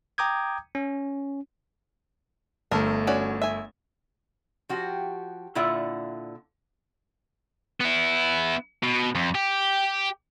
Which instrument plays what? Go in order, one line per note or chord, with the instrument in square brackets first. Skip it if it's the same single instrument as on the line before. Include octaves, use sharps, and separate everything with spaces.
[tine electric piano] G5 A#5 D6 D#6 G6 G#6
C#4
[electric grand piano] G1 A3 [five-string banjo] A4 A#4
[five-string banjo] C#4 F#4 D5
E5 G#5
[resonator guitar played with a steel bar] F3 F#4 G4
A#2 D3 E4 F4 E5 F#5
[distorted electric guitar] B3 E4
B2
F2
G4